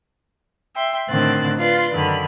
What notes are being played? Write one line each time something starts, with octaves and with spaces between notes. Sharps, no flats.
E5 G5 C6
A2 D3 D#3 C4 F#6 A6
F4 B4 D5 C6
F#2 D3 D#3 B5